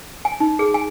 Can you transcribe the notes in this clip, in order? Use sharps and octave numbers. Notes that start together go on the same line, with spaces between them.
G#5
D#4
G#4
G#5